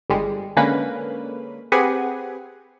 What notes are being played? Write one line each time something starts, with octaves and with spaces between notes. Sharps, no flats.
G1 G3 G#3
D3 G#3 A#3 C#4 B4 B5
C4 G4 G#4 B4 F#5 G#5